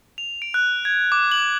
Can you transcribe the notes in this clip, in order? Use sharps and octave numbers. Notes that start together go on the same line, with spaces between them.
F7
D7
F#6
G#6
D6
F#7